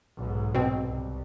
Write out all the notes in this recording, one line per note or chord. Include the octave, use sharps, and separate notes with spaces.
B1 G#2
B2 C4
C2